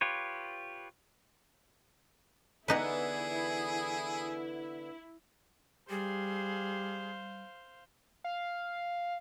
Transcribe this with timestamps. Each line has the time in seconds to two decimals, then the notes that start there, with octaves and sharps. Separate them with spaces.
0.01 F4 G4 B4 C#5
2.68 D3 E3 B3 D#4 E4 G#4 B4
5.90 G3 G4 G#4 C5 F5
8.24 F5